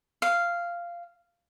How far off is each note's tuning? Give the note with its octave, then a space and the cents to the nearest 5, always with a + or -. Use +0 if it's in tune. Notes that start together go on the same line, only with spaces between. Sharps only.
F5 -10